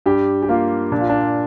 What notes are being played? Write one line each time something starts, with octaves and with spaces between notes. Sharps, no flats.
G2 G4
G4
A#3 F4
A#2 D4
F4
D4